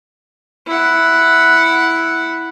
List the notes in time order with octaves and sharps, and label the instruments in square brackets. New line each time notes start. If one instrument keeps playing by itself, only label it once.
[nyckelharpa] E4 F#5